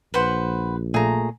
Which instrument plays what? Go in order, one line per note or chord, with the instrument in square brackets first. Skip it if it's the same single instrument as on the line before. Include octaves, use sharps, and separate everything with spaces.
[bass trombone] A#1 [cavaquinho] B4 C5 F#5
[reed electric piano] A#2 A3 [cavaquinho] G#4 A#5